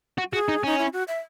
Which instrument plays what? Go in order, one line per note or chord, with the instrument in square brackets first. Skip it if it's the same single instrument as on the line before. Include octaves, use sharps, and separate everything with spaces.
[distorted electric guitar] F#4
[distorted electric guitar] F#4 [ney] G#4
[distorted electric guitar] D#4
[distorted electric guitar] C#4 [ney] D#4
[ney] E4
F#4
E5